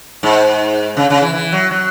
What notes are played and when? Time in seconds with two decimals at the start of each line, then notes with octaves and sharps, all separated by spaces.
0.23 G#2
0.97 C#3
1.10 C#3
1.22 E3
1.33 E3
1.52 F#3
1.71 F#3